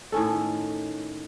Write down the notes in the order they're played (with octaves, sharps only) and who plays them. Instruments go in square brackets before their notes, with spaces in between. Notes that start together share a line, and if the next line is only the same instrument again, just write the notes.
[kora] A2 D#3 C#4 A4